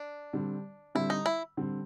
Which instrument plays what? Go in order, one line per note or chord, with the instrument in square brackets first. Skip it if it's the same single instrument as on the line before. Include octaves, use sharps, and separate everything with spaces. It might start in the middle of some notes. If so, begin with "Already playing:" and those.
Already playing: [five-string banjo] D4
[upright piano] D3 G3 C4
[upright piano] D3 G3 C4 [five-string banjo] E4
[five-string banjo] D#4
E4
[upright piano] D3 G3 C4